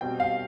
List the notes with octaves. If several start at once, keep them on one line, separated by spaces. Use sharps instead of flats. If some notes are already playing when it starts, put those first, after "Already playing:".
B2 G3 C4 G5
F5